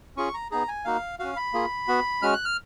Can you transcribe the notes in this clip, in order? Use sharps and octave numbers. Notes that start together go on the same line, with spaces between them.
C#4 F4 G#4 C#6
A#5
B3 D#4 G#4 A#5
G#5
A#3 D#4 F#4 F5
C#4 F#4 F5
B5
A#3 F4 G#4
B3 F#4
G#3 C#4 F#4 F6
F#6
F6